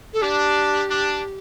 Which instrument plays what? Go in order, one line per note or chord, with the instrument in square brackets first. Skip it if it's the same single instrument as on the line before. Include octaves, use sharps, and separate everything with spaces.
[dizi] A4
[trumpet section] D4 [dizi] G4
[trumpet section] D4